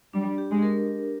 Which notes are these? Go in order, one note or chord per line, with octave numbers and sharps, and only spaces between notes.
G3 D4
G4
G#3
A#4